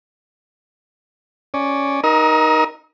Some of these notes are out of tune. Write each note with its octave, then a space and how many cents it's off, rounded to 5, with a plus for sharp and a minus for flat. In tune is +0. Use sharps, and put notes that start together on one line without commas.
C#4 +0 D5 +0
D#4 +0 A#4 +25 D#6 +45